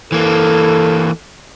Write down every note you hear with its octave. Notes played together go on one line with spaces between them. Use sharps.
E3 A#3 A4